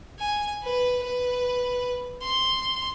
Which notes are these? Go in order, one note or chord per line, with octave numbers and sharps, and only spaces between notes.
G#5
B4
B4
C6